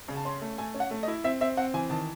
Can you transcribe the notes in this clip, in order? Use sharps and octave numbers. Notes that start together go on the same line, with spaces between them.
C#3
A5
C#4 C6
A3
A3 G#5
C#4
F#5
A3
D#5
E4
C4 E5
C4 E5
C4 F#5
E3 G#5
D#3 A5